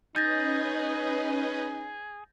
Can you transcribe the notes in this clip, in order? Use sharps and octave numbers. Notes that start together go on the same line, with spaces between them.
C#4 D#4 G#4 B4 D#5 G6 A6 A#6